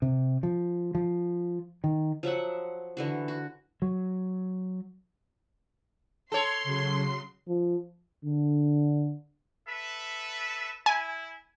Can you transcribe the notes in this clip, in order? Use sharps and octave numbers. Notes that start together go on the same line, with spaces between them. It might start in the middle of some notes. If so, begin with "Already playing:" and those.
C3
F3
F3
D#3
F3 F#3 E5 F#5
D3 E3 F#4
F#4
F#3
A4 C#5 C6
C#3 F#3 C7
F3
D3
A4 B4 E5
E4 G#5